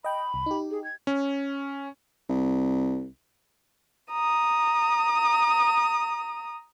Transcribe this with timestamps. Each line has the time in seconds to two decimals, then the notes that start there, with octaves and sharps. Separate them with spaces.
0.04 D#5 G5 B5
0.34 C2
0.46 D#4 G4
0.71 G#4
0.84 G#6
1.07 C#4
2.29 C2
4.12 A#5 D#6